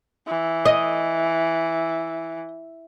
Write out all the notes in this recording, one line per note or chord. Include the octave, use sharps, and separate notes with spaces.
E3
D#5